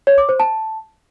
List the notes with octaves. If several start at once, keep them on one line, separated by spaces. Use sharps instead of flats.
C#5
D6
C5
A5